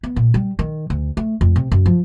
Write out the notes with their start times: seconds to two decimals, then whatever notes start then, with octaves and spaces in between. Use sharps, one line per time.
0.03 B3
0.16 A#2
0.34 G3
0.59 D#3
0.90 D2
1.17 A3
1.41 F2
1.56 C3
1.72 F#2
1.86 F3